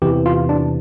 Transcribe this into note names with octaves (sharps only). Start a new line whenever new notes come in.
E2 C3 E3 G4
F4
D4